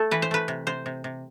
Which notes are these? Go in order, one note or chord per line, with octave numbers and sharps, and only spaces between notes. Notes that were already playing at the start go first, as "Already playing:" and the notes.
Already playing: A3 A4
E3 B4
C5
A3 B4
C3
C3 C5
C3
C3